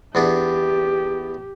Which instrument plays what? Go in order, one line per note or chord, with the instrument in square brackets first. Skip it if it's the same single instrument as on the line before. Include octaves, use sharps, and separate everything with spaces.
[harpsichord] E2 B3 D4 [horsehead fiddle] G4